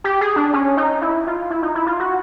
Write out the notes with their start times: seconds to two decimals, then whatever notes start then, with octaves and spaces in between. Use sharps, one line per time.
0.04 G4
0.21 G#4
0.36 D4
0.53 C#4
0.77 D#4
1.02 E4
1.27 F4
1.50 E4
1.62 D#4
1.75 E4
1.87 F4
2.00 F#4